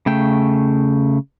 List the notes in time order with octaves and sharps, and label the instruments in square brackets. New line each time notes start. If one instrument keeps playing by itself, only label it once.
[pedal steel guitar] C#3 A3 G5